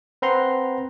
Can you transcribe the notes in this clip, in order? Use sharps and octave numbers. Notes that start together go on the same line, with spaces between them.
C4 B4 C5 F#5 A#5 C6